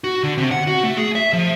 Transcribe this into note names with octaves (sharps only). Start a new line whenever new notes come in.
F#4
D3
C3
F#5
F#4
A3
G#4
E5
F3